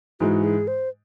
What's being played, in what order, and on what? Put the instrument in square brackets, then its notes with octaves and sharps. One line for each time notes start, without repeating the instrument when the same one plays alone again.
[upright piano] G#2 E3 G#3 [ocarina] F#4
[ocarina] G#4
C5